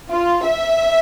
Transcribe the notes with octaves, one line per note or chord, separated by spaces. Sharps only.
F4
E5